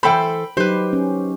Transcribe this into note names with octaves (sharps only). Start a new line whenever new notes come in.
E3 A4 C5 G5 B5
F#3 D#4 G4 B4 C5
C#4